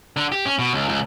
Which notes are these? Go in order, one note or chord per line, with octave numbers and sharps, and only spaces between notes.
D3
G4
C#4
B2
C#2
C#2